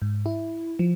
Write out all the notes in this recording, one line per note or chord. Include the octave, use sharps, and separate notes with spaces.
G#2
E4
F3